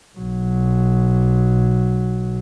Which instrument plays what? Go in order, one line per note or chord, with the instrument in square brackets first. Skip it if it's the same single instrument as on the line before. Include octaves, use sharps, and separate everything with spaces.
[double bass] B1 F#3